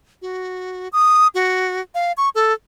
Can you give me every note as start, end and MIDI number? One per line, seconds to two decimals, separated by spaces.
0.22 0.88 66
0.93 1.27 87
1.34 1.81 66
1.94 2.12 77
2.17 2.29 85
2.35 2.53 69